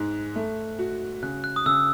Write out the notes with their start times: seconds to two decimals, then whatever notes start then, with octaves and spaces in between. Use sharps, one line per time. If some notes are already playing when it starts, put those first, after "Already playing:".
Already playing: G#2 G#3 F#6
0.36 A3
0.79 F#4
1.22 C#3 F#6
1.44 F#6
1.56 D#6
1.66 C#3 E6